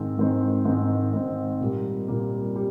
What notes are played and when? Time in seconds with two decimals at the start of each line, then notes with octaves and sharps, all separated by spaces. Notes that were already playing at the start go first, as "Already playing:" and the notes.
Already playing: G#2 D#3 G#3 C4
0.18 G#2 D#3 G#3 C4
0.65 G#2 D#3 G#3 C4
1.13 G#2 D#3 G#3 C4
1.61 A#2 G3 A#3
2.08 A#2 G3 A#3
2.56 G3